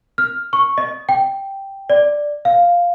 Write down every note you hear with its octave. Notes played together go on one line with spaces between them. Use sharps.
F6
C#6
D#5
G5
D5
F5